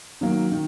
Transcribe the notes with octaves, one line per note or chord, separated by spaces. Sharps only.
D#3 F#3 A#3
D#3